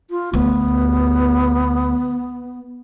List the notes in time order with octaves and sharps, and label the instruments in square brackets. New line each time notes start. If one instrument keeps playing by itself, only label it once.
[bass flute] F4
[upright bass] D2 [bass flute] B3